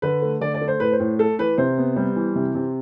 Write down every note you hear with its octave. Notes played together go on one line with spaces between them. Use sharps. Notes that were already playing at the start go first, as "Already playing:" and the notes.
D3 B4
A3
D3 D5
D5
A3
C5
A2 B4
C5
A2
A3 A4
E3 B4
C3 C5
B3
G3
E3
C3
C3